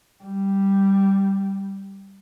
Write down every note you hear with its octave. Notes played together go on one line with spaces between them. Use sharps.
G3